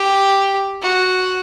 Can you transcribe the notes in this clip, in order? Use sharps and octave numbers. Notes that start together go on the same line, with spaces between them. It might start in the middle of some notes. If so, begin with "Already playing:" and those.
Already playing: G4
F#4